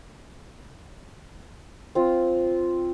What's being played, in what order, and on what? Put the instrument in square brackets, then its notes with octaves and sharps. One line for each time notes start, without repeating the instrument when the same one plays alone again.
[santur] C4 F4